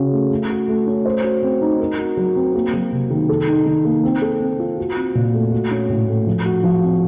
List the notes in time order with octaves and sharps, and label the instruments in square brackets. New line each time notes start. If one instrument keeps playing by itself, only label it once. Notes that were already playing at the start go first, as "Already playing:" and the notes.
Already playing: [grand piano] C#3 C#4 F#4
A3
A3
F#4
A3
C#4
C5
F#4
C4
D#4
A#4
F#4
F#3
C4
A#3
F#3
C3
D#3
A4
D#4
D#3
A#3
C4
A4
C4
F4
F#4
C4
A#2
A3
F#4
C#4
A2
A3
F3
F#4
F3
C4